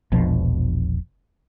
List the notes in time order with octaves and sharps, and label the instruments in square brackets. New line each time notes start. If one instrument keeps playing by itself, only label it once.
[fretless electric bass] E1 A#1 B2 F3